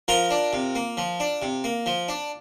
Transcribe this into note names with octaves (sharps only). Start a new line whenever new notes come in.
F3 F4 A#4
D4
C3
A#3
F3
D4
C3
A#3
F3
D4